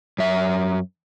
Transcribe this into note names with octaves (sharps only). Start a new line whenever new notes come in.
F#2 E5